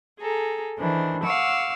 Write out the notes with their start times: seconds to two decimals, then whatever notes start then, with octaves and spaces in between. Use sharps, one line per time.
0.20 G#4 A4 A#5
0.78 D#3 E3 D4 C5
1.23 F5 F#5 C#6 D6 E6